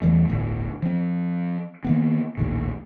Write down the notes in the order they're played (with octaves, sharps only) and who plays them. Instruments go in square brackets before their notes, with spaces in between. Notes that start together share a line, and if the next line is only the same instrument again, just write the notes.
[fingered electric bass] E2 E3 G3 A3
D1 G1 A2
F3 C4
D#3 A#3 B3
A#1 D#2 A2